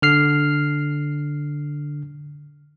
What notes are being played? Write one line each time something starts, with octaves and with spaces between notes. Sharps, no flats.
D3 F6 C7